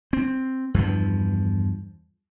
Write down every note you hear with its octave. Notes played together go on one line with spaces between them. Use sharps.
C4
E2 G2 F3